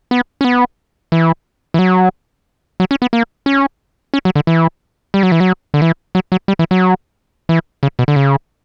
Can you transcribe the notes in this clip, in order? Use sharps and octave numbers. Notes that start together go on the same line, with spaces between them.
B3
C#4
B3
E3
E3
F#3
F#3
C#4
B3
A#3
C#4
C#4
F#3
D3
E3
G3
F#3
E3
F#3
D3
E3
F#3
F#3
G3
E3
F#3
E3
C#3
B2
D3
C#3